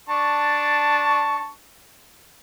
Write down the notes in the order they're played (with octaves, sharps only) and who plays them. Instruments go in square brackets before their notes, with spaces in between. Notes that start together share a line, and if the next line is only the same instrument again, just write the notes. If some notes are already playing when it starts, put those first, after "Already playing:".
[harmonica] D4 A5 C#6